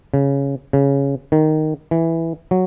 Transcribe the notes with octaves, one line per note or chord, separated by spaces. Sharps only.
C#3
C#3
D#3
E3
F#3